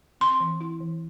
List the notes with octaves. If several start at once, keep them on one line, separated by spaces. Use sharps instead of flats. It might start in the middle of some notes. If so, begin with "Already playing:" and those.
C4 C6
E3
E4
E3